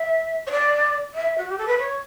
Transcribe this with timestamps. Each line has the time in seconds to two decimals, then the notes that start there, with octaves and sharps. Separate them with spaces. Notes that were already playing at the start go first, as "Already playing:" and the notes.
Already playing: E5
0.46 C#5
0.51 D5
1.14 E5
1.37 F#4
1.48 G4
1.58 A4
1.67 B4
1.78 C#5